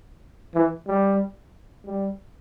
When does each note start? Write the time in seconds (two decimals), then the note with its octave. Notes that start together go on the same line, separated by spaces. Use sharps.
0.55 E3
0.87 G3
1.85 G3